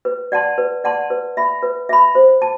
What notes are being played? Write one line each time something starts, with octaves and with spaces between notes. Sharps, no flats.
B4
D5 F#5 A5 C6
B4
D5 F#5 A5 C6
B4
E5 B5
B4
E5 B5
C5
A5